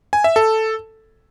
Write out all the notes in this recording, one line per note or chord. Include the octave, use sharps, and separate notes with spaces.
G#5
E5
A4